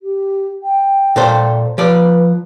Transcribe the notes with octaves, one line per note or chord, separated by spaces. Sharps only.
G4
G5
A#2 A4 C5
F3 B4 D5